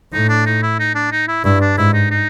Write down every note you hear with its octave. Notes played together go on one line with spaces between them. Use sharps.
A2 D#4
D4
D#4
E4
D#4
D4
D#4
E4
G2 E4
D4
G#2 E4
D#4
D#4